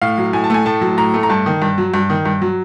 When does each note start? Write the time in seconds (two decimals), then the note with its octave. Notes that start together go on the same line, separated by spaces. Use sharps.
0.02 A2 F5
0.18 F#3
0.33 A2 G#5
0.44 A5
0.50 A3 G#5
0.66 A2 A5
0.81 F#3
0.98 A2 A#5
1.14 A3
1.23 A#5
1.30 G2 A5
1.46 D#3
1.62 G2
1.78 F#3
1.94 G2
2.10 D#3
2.25 G2
2.42 F#3